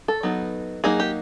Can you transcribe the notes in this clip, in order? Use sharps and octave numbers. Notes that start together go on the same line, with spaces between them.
A4
F#3 B3 D#4
F#3 A#3 D#4 G#4
G4